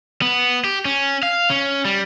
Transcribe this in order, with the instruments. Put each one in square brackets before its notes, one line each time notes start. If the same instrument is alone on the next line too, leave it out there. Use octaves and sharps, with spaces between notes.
[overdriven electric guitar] B3
G4
C#4
F5
C#4
G3